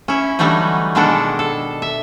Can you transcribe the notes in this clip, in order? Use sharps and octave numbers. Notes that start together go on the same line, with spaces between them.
C#4 E4
D3 E3 F#3 G3 A3 D#4
B2 D#3 G#3 B3 D4 A4
A4
E5